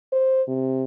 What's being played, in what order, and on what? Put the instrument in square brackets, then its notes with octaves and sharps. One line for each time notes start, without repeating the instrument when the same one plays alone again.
[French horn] C5
C3